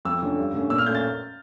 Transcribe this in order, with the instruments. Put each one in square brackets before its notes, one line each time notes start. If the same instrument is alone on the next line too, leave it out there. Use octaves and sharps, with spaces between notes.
[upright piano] F2 E6
D3 F3 A3 C#4
G2
D3 A3 C#4
A#2 E6
F6
A3 C#4 G6
A6